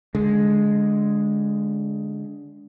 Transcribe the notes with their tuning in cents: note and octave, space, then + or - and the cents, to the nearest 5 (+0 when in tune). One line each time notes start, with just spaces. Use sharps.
D3 -20 G#3 +0